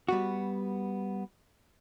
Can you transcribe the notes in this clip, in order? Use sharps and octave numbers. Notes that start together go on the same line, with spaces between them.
G3 B3 F#4